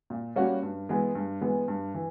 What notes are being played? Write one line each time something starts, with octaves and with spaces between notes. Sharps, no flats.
A#2
G3 A#3 C#4 F#4
G2
E3 G#3 B3
G2
E3 G#3 B3
G2
E3